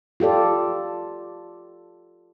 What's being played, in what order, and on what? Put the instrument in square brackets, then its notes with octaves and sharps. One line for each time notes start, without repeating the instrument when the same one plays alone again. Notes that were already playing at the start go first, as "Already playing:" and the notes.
[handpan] F4 G4 A4 D5